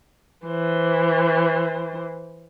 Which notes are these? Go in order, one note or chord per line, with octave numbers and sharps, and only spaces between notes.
E3 C5